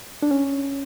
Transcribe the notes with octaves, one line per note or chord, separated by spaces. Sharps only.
D4
C#4